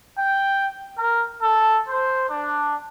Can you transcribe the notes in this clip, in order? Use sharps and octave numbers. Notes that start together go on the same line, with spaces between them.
G5
A#4
A4
C5
D4